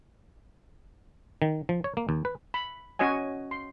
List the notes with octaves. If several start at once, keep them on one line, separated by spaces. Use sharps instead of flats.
D#3
F3
C#5
A#3
D#2
B4
B5
C#4 F#4 C#5 D#5 G#5
C6